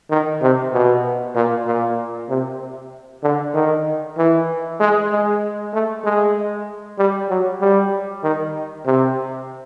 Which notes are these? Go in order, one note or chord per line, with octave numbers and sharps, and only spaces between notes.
D#3
C3
B2
A#2
A#2
C3
D3
D#3
E3
G#3
G#3
A3
G#3
G3
F#3
G3
D#3
C3